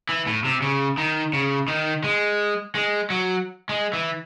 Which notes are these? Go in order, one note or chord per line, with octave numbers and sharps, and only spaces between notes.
E3
A2
C3
C#3
D#3
C#3
D#3
G#3
G#3
F#3
G#3
E3